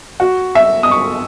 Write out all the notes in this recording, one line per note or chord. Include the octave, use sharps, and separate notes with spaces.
F#4
E5
D#6
C#6